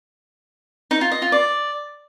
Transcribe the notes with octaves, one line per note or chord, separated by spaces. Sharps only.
D#4
F4
D#5
F4
D5